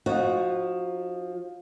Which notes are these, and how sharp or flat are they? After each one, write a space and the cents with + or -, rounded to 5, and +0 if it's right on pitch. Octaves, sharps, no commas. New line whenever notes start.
F3 +20 D#4 +0 F#4 +0